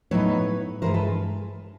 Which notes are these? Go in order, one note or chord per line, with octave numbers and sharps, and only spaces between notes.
A2 F#3 B3 D#4 B4 C#5
G2 E3 G#3 A#4 C5
A4 B4